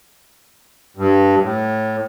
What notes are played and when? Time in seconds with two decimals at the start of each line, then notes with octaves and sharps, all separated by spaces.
0.97 G2
1.40 A2